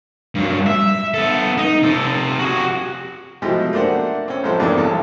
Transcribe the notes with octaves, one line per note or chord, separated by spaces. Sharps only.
G2 F#3
E5
B3 A4
D#4
C3 A4
F#4 G#4
B2 E3 F3 G#3 A3 G4
A3 A#3 D4 C5 F#5
C4 C#4
A1 F3 G3 G#3 A4 C5
E2 G2 E3 A#3 C4 D4
B1 E3 A4